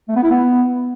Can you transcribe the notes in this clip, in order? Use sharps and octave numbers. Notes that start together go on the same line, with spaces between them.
A3
B3
E4
B3